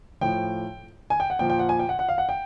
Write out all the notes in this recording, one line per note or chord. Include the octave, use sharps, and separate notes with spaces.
A2 F3 G5
G#5
G5
F#5
A#2 F3 G5
G5
F#5
G#5
G5
F#5
F#5
F5
F#5
G5